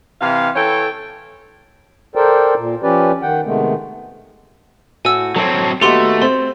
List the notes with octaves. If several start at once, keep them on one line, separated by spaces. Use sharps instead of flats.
C3 E3 F5
E3 A4 C#5 G5
A4 A#4 C5 D5 G5
A#2
F3 C#4 G4 B4 D5
D#3 F#5 G5
C3 D#3 G#3 A3 B3
A2 F#4 G#5 E6
F#3 C4 A4 C#5
D#2 A3 B3 F#4 G4 C6
C4 C6